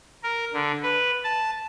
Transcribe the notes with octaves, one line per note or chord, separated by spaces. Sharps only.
A#4
D3
B4
A5